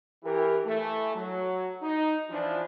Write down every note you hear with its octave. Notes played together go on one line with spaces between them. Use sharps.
E3 G4 A#4
E3 A3
F#3
D#4
E3 F3 D4